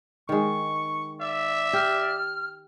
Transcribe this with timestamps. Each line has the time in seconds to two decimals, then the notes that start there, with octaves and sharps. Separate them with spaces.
0.29 D#3 G#3 C#6
1.21 D5 E5
1.73 G4 F6